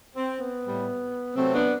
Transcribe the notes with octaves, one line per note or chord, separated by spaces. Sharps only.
C4
B3
A2 G3
C3 F#3 A3 C4
B3 D4